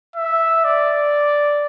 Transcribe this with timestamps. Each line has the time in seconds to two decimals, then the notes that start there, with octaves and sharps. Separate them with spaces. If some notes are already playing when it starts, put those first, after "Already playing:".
0.16 E5
0.64 D5